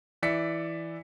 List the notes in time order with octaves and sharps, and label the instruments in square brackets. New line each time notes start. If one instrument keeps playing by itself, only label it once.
[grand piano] E3 D5 E5 B6 C#7